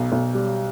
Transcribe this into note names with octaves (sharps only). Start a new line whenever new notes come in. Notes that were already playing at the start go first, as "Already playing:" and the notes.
Already playing: B1
B1
G3